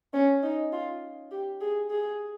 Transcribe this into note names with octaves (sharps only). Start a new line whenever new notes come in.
C#4
D#4
F4
G4
G#4
G#4